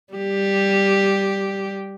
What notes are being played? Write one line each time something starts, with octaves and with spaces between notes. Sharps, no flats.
G3 G4